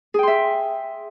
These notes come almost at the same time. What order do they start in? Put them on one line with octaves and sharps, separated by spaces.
G#4 G5 C6 E5